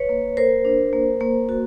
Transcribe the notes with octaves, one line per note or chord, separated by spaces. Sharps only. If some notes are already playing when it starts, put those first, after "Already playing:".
Already playing: B4 C#5
A#3
A#3 A#4 C5
D4
A#3
A#3
F#4